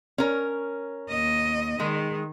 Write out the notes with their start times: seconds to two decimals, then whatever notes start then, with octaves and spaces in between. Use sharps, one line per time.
0.18 C#4 A#4
1.10 D#2 D#5
1.80 D#3 G#3